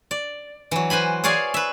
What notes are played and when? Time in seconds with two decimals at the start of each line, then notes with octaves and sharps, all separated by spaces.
0.11 D5
0.71 E3 F#3
0.90 B4 C5 G#5 B5
1.24 G#4 C#5 D5 F5 G#5
1.54 B4 E5